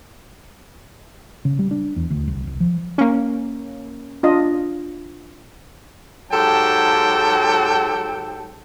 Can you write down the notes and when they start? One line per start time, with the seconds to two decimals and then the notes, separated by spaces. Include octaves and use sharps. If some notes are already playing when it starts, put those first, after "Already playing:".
1.45 C#3
1.59 G3
1.71 D4
1.96 E2
2.10 D2
2.27 C2
2.47 C2
2.60 F3
2.98 A#3 C#4
4.23 D4 F4 D#5
6.31 G#2 F#3 G4 A4 G5 A5